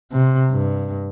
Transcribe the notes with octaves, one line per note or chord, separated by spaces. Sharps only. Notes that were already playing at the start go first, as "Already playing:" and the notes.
C3
G2